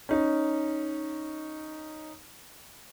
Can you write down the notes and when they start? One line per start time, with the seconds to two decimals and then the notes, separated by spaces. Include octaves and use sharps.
0.09 C#4 D#4